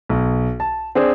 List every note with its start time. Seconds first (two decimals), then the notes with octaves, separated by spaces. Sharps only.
0.09 B1
0.60 A5
0.95 C4 D4 G#4 C5